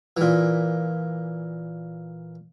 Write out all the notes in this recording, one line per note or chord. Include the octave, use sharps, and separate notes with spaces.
A#2 E3